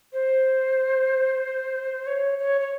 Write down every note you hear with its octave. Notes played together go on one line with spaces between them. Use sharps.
C5
C#5
C#5
C#5